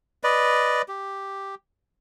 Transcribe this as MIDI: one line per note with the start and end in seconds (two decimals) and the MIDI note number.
0.24 0.82 71
0.24 0.82 74
0.24 0.82 75
0.88 1.55 67